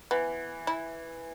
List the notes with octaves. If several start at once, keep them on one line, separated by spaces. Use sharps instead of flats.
E3 B3
E4